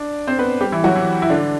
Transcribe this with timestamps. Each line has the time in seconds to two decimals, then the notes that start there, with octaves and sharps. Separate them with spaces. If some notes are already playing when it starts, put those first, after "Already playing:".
Already playing: D4 D5
0.27 C4 C5
0.39 B3 B4
0.61 G3 G4
0.72 E3 E4
0.84 F#3 F#4
0.95 E3 E4
1.22 E4
1.29 D3 D4